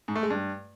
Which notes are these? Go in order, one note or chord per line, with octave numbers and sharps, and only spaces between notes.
G#2
A3
G#3
G2